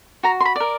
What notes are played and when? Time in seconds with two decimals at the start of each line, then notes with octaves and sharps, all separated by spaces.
0.23 F#4 A#5
0.40 C6
0.45 B5
0.56 A#4 D5